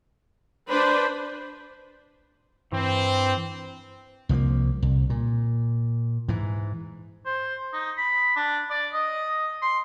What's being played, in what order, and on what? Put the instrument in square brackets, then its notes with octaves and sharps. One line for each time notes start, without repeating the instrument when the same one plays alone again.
[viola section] D4 B4 B5 [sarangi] C5
[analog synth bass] G2 [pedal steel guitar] E3 [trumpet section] C4
[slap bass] C2 F3 G#3 A#3
C2
A#2
G#2 E3
[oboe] C5
D#4
B5
D4
D5
D#5
C6